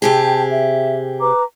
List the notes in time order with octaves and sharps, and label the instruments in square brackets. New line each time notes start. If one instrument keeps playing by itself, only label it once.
[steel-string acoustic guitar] C3 G4 G#4 [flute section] G5 A5
[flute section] E5
B4 A#5 D6